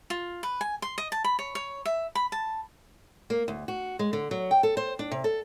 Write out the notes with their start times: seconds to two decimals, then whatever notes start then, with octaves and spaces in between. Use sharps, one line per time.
0.10 F4
0.43 B4
0.61 G#5
0.82 C6
0.98 D#5
1.12 A5
1.24 B5
1.39 C#5
1.55 C#5
1.85 E5
2.15 B5
2.32 A5
3.30 A#3
3.48 D2
3.68 F#4
3.99 G#3
4.13 D3
4.31 F#3
4.51 G5
4.63 A4
4.77 C5
4.99 D4
5.11 C3
5.24 A4